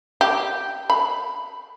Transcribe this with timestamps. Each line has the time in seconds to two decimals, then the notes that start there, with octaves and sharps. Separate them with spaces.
0.21 G4
0.90 B5